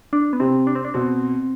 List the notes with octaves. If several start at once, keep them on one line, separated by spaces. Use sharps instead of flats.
D4
B3
C3 C4
D4
C4
D4
B2 C4